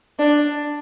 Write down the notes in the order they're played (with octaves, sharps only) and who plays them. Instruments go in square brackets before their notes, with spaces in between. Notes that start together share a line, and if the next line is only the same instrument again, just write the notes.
[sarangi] D4